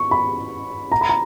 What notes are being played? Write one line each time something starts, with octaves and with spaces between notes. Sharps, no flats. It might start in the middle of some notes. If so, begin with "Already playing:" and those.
Already playing: C#6
B5
A#5
B5
A#5